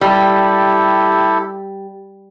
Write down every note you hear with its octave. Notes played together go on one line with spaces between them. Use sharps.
G3 E4 G4 A4